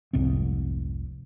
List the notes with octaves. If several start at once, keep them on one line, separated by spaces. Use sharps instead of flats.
F1 C2 G#2 C4